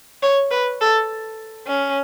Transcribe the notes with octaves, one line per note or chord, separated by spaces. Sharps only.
C#5
B4
A4
C#4